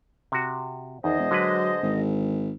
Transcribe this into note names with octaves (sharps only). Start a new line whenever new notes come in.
C3 F#4
E2 D#3 G#4 C5 D#5
E1
D3 F#3 G#3 B4
G#1